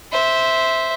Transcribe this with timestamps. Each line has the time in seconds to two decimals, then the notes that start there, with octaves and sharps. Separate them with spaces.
0.12 C5 E5